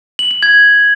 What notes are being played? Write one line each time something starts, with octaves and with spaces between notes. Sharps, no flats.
F#7
F#7
G#6